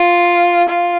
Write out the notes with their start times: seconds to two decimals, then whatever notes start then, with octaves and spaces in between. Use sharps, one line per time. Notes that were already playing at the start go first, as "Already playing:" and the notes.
Already playing: F4
0.68 F4